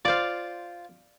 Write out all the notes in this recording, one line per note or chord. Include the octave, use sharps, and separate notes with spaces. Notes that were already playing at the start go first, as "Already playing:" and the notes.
F4 C5 D5 F5